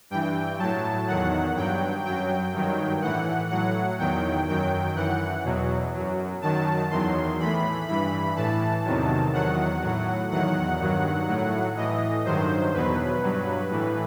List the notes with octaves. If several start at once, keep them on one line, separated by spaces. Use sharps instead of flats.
G2 E3 G5
A2 F#3 A5
E2 D#3 F#3 F#5
G2 F#3 G5
F#2 F#3 G5
G2 D#3 F#3
A2 E3 F#5
A2 F#3 F#5
E2 D#3 F#3 G5
F#2 D#3 F#3 G5
F#2 E3 F#5
E2 B2 F#3
F#2 F#3
F#2 D#3 F#3 A5
E2 D#3 F#3 C6
A2 E3 B5
G2 E3 B5
A2 E3 A5
E2 C3 D#3 F#3
E2 D#3 F#3 F#5
A2 F#3
E2 D#3 F#3 F#5
G2 D#3 F#3
A2 F#3
A2 E3 D#5
G2 D#3 F#3 C5
E2 B2 F#3 B4
G2 F#3
A2 E3